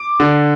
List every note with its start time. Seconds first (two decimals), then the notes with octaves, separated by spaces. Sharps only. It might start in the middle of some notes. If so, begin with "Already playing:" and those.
Already playing: D6
0.20 D3